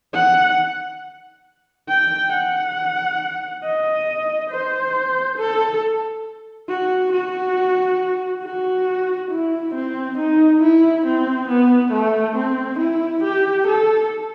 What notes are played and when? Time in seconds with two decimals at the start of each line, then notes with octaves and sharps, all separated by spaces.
0.14 F#5
1.89 G5
2.32 F#5
3.64 D#5
4.50 C5
5.38 A4
6.69 F#4
7.12 F#4
8.43 F#4
9.31 E4
9.75 C4
10.18 D#4
10.62 E4
11.05 C4
11.48 B3
11.93 A3
12.36 C4
12.79 E4
13.24 G4
13.67 A4